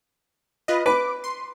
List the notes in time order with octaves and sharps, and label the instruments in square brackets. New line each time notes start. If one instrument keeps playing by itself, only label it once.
[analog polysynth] F4 B4 D#5
[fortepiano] B4 [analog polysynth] D6
[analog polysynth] C6